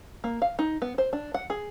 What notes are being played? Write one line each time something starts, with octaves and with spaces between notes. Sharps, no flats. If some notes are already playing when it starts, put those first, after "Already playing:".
A#3
F5
D#4
B3
C5
D4
F#5
G#4